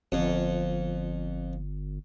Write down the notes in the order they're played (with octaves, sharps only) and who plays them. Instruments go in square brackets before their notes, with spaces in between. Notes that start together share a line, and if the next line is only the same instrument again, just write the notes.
[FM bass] G1 [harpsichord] F2